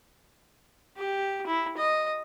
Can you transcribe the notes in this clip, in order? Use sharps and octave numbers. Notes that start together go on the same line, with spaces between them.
G4
E4
D#5